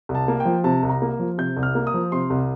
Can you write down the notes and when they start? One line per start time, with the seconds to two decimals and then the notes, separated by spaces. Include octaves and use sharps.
0.09 C2
0.15 A5
0.28 A#3
0.40 G5
0.45 F3
0.64 C3 A5
0.83 C2
0.89 A#5
1.02 A#3
1.19 F3
1.38 C3 G6
1.57 C2
1.63 F6
1.75 A#3
1.87 D#6
1.94 F3
2.12 C3 C6
2.30 C2